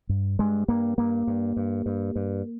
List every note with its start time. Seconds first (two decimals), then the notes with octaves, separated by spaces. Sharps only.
0.09 G2
0.39 G2 G#3
0.68 G2 A#3
0.98 G2 A#3
1.27 G2
1.57 G2
1.86 G2
2.16 G2